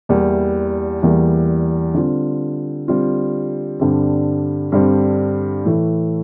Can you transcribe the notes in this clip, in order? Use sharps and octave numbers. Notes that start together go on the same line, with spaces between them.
E2 E3 G3 A#3
E2 E3 G3 A#3
D3 G3 C4 F4
D3 G3 C4 F4
G2 D3 G3 C4
G2 D3 G3 C4
A2 E3 A3